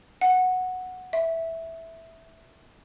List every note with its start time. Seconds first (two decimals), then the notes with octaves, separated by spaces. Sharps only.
0.21 F#5
1.13 E5